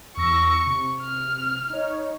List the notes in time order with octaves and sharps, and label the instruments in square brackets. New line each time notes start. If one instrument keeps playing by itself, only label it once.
[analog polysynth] E2 E6 A#6 [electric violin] C#6
[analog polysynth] C3
[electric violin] F6
[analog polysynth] D#4 C#5